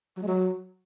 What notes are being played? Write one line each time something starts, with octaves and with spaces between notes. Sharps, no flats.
F#3
G#3
F#3